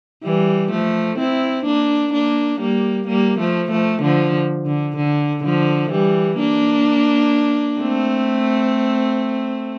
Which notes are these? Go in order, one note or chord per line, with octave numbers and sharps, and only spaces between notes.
E3 G3
F3 A3
C4 E4
A#3 D4
A#3 D4
G3 A#3
G3 A#3
F3 A3
F3 A3
D3 F3
D3
D3
D3 F3
E3 G3
A#3 D4
A3 C4